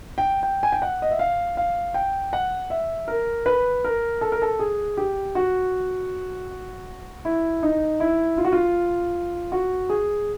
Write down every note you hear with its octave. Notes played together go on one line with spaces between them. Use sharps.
G5
G5
G#5
G5
F#5
D#5
E5
F5
F5
G5
F#5
E5
A#4
B4
A#4
A4
A#4
A4
G#4
G4
F#4
E4
D#4
E4
F4
F#4
F4
F#4
G#4